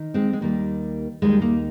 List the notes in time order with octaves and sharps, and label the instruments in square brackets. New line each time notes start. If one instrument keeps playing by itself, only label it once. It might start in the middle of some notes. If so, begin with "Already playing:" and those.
Already playing: [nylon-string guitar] D#3
G#3 C4
G#3
D#2 D#3 G3 A#3
D#2 D#3 G3 G#3
A#3